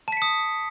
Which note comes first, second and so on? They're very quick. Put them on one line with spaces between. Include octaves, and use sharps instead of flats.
A5 B6 C#7 D#6